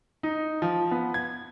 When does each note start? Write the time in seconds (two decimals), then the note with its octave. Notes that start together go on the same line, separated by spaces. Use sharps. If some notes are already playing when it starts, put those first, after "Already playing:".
0.23 D#4
0.62 F3
0.91 B3
1.14 G#6